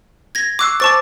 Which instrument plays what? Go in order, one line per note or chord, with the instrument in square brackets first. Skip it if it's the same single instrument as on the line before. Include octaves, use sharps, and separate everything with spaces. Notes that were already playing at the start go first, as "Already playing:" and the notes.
[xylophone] G#6 A#6
[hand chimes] C#6 E6 [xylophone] D6 F#6 C7
[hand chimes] C5 D6 [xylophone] A5 C#6 A6